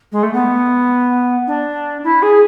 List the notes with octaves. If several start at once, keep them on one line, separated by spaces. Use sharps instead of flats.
G#3
A3
B3
D4
E4
G#4